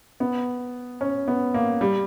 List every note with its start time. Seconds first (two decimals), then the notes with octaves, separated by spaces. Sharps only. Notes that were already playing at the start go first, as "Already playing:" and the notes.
0.20 B3
1.01 C#4
1.28 B3
1.54 A#3
1.81 G3